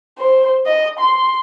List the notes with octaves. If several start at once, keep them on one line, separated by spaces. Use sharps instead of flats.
C5
D#5
C6